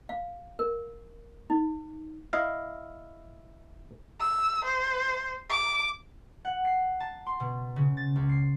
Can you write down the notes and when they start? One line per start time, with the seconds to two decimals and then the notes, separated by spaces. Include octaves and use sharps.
0.09 F5
0.59 A#4
1.50 D#4
2.33 E4 D#5 F5
4.20 E6
4.65 C5
5.50 D6
6.45 F#5
6.65 C7
7.00 A5
7.26 C6
7.40 B2
7.76 C#3
7.97 A6
8.16 C#2
8.29 C7